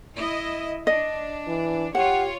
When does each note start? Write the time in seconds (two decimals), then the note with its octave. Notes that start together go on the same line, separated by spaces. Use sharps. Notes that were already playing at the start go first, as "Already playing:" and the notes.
0.15 E4 D#5
0.87 D4 D#5
1.47 E3
1.95 F4 G4 C#5 F#5